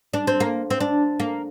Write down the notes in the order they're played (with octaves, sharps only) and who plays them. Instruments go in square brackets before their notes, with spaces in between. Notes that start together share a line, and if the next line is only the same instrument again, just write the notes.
[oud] D4
C4
A#3
C4
D4
A#3